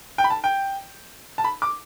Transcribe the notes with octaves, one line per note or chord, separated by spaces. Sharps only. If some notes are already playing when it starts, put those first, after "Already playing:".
G5
B5
A5
G5
A5
B5
D6